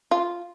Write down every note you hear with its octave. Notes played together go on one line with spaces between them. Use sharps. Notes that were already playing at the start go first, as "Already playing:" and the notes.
F4